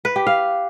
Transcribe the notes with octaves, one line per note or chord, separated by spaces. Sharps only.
B4
G4
F5